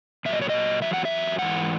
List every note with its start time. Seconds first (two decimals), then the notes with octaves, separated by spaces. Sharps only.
0.25 A#2 E5
0.29 F#3 D#5
0.42 C#5
0.49 D#5
0.82 E2 D#3 F#3 E5
0.94 F#5
1.05 E5
1.38 G#2 E3 F#5